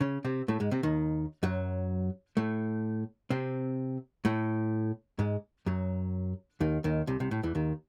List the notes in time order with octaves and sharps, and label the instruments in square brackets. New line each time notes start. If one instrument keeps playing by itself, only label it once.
[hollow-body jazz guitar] C#3 C#4
C3 C4
A2 A3
G#2 G#3
C3 C4
D#2 D#3
F#2 F#3
A2 A3
C3 C4
A2 A3
G#2 G#3
F#2 F#3
D#2 D#3
D#2 D#3
C2 C3
C2 C3
A2
E2 E3
D#2 D#3